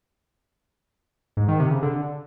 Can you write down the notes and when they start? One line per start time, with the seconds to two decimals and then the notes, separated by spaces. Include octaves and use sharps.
1.37 G#2
1.48 D#3
1.60 C3
1.71 C#3
1.82 D3